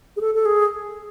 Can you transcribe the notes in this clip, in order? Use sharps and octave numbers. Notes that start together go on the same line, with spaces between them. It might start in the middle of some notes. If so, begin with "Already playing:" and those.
G#4
A4
A4
G#4